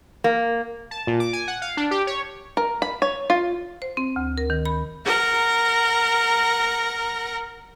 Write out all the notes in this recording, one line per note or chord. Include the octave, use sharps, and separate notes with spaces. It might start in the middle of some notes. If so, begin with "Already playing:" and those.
A#3
A5
A#2
D6
G#5
F#5
F5
D4
G4
C#5
A#4
B5
C#5
F4
C5
C4
D2
A#4
D#3
B5
A#4 F#5 A#5